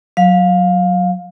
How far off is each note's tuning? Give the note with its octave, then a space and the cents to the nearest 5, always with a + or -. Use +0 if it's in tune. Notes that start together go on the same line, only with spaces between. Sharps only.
F#3 -5 F5 +15